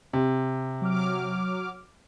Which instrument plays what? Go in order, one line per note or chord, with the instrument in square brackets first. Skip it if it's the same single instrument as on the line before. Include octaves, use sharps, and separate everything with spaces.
[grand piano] C3
[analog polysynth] F#3 D6 F6